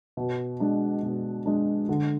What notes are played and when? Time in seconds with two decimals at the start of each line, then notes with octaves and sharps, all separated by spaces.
0.17 B2
0.60 G#3 D4
1.03 B2
1.46 G#3 D4
1.89 D3